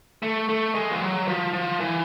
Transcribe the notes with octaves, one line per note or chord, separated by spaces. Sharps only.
A3
A3
G#3
F3
F#3
F3
F3
E3